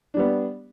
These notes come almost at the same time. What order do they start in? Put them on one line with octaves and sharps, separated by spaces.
D4 G3 B3